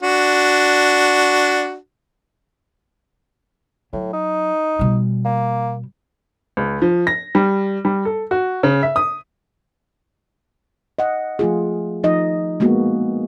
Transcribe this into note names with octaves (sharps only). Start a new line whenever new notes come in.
D4 F#4
A2 F#3
D#4
B2 G3
A#3
C#2
F3
A#6
G3
G3
A4
F#4
C#3
E5
D#6
D#5 F#5
F3 A3 F4 G#4
F3 D#4 D#5
G#3 A#3 B3 F#4